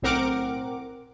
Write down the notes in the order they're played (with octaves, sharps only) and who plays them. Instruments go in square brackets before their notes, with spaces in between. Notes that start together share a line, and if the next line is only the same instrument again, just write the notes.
[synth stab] B1 A2 C4 A#4 F#5 D6